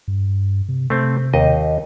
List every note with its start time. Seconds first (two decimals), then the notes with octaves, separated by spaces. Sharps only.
0.08 G2
0.69 C3
0.90 C3 A3 C4
1.34 D#2 D#5